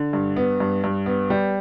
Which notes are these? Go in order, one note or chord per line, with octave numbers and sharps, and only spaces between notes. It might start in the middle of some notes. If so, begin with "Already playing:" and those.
Already playing: D3
G2
B3
G2
G2
B3
G3